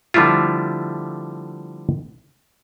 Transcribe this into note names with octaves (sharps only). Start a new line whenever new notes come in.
D3 F3 G3 A3 E4 F4